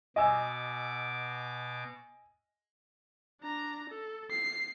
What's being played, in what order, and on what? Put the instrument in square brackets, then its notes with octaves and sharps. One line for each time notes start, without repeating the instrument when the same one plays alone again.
[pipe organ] B2 D6 [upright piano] D#5 G#5 E6
[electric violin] D4 A#5
A4
C7